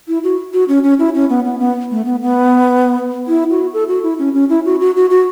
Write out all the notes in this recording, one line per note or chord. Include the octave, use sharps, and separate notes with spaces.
E4
F#4
F#4
C#4
C#4
E4
C#4
B3
B3
B3
A3
B3
B3
E4
F#4
A4
F#4
E4
C#4
C#4
E4
F#4
F#4
F#4
F#4